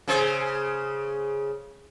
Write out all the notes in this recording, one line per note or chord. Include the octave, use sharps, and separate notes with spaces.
C#3 G#4 C5